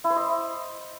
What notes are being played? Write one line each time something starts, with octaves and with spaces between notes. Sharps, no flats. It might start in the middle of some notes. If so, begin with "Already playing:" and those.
E4
C5
D#5